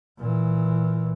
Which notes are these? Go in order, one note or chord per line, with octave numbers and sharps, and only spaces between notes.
A#2 E3